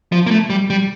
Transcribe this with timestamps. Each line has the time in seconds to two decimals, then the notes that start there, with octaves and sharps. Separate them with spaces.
0.12 F3
0.26 A#3
0.31 A3
0.50 G3
0.70 G3